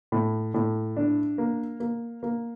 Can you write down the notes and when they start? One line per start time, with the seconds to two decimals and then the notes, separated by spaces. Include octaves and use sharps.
0.12 A2
0.54 A2
0.97 D4
1.38 A#3
1.80 A#3
2.23 A#3